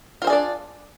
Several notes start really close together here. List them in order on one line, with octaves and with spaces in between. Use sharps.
F4 C5 G#4 D5 D4